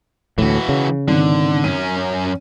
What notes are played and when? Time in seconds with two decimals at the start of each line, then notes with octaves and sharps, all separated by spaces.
0.38 D2 A2 E3 F#4
0.69 C#3
1.08 G#1 D3
1.64 F#2 C#4 D#7